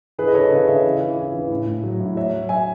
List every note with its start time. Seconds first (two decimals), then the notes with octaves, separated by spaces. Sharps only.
0.18 E3 G#4 B4
0.27 D#5
0.34 C#3 A4 C#5
0.51 C#3 B4 D#5
0.67 C#3 C#5 E5
0.84 E3
1.01 E3
1.17 E3
1.34 E3
1.50 A2
1.67 A2
1.84 F#3
2.00 A2
2.17 F#3 C#5 E5
2.33 F#3
2.49 F#3 E5 G#5